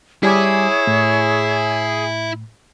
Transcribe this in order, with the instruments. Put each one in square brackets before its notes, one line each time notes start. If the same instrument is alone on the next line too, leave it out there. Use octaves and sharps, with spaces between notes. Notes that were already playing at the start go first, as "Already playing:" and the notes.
[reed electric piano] G3 G#5 D6 [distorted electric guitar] E4 [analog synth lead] G#4 [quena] C#5
[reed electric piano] A2